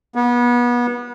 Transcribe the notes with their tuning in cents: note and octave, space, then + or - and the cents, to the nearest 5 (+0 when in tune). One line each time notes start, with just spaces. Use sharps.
B3 -30